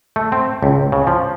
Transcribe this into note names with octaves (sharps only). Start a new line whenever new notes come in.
A3
C4
C#2
C#3
F3